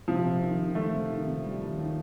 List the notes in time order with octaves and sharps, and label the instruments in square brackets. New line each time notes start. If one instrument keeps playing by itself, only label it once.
[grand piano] C3 [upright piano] F3
[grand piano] C3
D#3
D#3
[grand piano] D#3 [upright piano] A3
[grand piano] C3
D#3
C3
G3
D#2
D#3